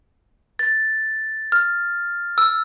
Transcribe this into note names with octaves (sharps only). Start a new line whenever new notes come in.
A6
F6
E6